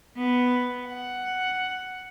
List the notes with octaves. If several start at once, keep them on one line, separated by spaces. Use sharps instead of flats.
B3
F#5